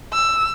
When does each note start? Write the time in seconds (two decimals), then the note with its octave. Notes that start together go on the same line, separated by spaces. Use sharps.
0.13 E6